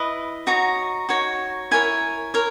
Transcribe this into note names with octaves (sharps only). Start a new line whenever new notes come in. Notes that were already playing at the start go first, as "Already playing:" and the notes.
Already playing: E4 B4 D#5
D#4 F#4 C#5 A#5
D#4 F#4 C#5
E4 A#4 C#5 G#5
A#4 C#5